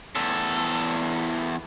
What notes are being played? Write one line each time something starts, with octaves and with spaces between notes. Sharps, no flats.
E2 A4